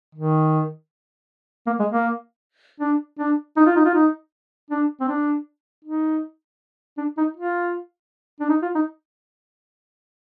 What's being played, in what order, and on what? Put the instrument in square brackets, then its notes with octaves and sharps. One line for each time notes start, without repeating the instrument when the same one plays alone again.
[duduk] D#3
A#3
G#3
A#3
D4
D4
D#4
F4
D#4
F4
D#4
D4
C4
D4
D#4
D4
D#4
F4
D4
D#4
F4
D#4